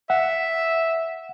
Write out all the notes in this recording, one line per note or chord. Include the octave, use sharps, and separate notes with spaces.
E5 F#5